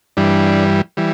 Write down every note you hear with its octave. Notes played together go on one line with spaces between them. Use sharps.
G2 E3 G3 D4
E3 G3